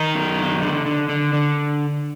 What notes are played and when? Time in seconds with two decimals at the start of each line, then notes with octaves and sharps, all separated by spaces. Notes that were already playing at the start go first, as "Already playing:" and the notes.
Already playing: D#3 D#4
0.14 F#2
0.39 D3
0.62 D3
0.86 D3
1.09 D3
1.33 D3